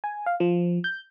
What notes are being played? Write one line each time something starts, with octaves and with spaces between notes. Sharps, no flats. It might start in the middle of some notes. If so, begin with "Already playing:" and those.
G#5
F5
F3
G6